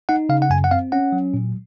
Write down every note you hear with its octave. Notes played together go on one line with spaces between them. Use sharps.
D#4 F#5
C#3 F5
F#5
F#2 G#5
F#5
C4 F5
C#4 F#5
F#3
A#2